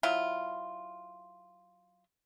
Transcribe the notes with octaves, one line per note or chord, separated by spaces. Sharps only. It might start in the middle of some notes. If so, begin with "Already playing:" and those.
F#3 E4 F4